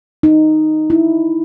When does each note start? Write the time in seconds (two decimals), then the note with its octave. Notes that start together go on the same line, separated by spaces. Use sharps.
0.23 D#4
0.90 E4